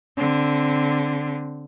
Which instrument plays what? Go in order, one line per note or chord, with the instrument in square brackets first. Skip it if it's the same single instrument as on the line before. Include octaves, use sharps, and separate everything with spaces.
[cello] D3 C4